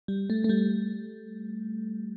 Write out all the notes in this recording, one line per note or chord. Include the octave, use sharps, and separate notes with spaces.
G3
A3
A3
G3